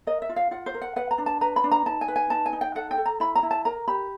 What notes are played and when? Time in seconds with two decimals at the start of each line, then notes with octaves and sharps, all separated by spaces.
0.07 A#4 D#5
0.22 E5
0.29 F4
0.36 F5
0.51 F4 F#5
0.66 C5
0.74 A#4
0.82 F#5
0.96 B4 F#5
1.11 A#5
1.18 D4
1.26 A5
1.41 B4 A#5
1.56 B5
1.64 D4
1.71 A#5
1.86 D#4 A5
2.01 G#5
2.08 B4
2.16 G#5
2.30 D#4 A5
2.46 G#5
2.53 D#4
2.61 G5
2.75 A4 F#5
2.91 G5
2.97 A4
3.06 A#5
3.20 E4 B5
3.35 A#5
3.43 E4
3.51 A5
3.65 A#4 A#5
3.88 G4 B5